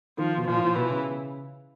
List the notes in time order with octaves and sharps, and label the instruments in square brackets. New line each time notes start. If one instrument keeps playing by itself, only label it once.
[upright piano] D#3 [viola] F3
[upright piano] B2
[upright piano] A#2 [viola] F3
[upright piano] A2
A#2
[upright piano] B2 [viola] E3
[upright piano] C#3